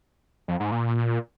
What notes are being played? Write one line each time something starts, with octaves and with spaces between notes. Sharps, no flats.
F2
G#2
A#2